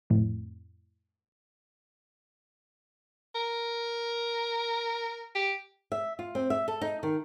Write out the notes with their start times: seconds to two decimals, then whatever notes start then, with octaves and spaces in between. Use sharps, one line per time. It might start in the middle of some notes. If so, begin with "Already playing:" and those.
0.10 F2 A2
3.35 A#4
5.35 G4
5.92 E5
6.19 F4
6.35 C4
6.50 E5
6.68 A4
6.81 D#4
7.03 D#3